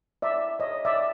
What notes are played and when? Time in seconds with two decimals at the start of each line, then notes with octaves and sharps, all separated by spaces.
0.22 D5 E5
0.59 C#5 D#5
0.85 D5 E5